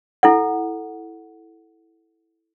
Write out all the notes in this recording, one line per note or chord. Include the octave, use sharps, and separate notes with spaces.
E4 A4 F#5